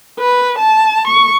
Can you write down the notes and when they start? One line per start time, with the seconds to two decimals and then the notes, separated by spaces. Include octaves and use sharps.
0.19 B4
0.59 A5
1.07 C#6